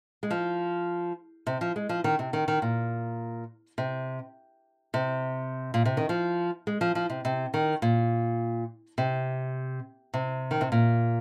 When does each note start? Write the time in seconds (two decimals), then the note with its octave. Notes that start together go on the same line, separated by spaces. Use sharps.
0.23 G#3
0.31 F3
1.47 C3
1.61 F3
1.76 G#3
1.89 F3
2.04 D#3
2.19 C3
2.33 D#3
2.48 D#3
2.62 A#2
3.78 C3
4.94 C3
5.74 A#2
5.85 C3
5.97 D#3
6.09 F3
6.67 G#3
6.81 F3
6.95 F3
7.10 C3
7.25 C3
7.54 D#3
7.82 A#2
8.98 C3
10.14 C3
10.51 D#3
10.61 C3
10.72 A#2